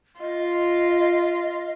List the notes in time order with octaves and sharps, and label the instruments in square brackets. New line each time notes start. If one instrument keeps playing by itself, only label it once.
[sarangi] F4 [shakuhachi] D#5